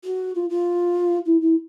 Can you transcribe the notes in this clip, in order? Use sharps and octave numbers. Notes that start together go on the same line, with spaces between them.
F#4
F4
F4
E4
E4